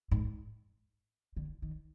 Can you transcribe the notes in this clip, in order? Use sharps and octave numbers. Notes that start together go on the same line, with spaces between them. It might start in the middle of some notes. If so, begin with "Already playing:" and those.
G#2
D3
D#3